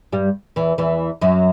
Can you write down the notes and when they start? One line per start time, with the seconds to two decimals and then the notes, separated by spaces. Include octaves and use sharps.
0.12 G2 G3
0.56 E2 E3
0.78 E2 E3
1.21 F#2 F#3